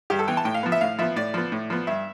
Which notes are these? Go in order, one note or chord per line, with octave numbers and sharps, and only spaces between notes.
G2 G4
A4
E3 B3 G5
A5
A2 G5
F5
F3 B3
E5
A2 F5
F3 B3 E5
A2 D5
F3 B3
A2
F3 B3
G2 E5